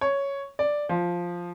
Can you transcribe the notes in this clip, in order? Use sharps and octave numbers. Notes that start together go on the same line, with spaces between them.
C#5
D5
F3